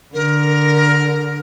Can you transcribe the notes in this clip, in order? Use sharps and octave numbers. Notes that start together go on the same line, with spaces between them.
D3 A#4